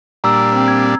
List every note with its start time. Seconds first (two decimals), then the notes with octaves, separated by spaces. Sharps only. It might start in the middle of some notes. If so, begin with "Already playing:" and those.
0.24 A#2 G3 D4 A#5 E6
0.53 C4
0.68 G#6